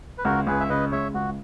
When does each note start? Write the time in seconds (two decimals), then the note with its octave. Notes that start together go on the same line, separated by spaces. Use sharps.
0.18 B4
0.24 C#2 F#4 A#4
0.47 C#2 G#4 B4
0.60 E5
0.69 C#3 B4 D#5
0.92 G#3 C#5 E5
1.14 C#2 F#4